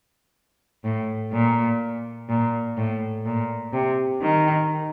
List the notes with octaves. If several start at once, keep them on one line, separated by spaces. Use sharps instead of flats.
A2
A#2
A#2
A2
A#2
C3
D#3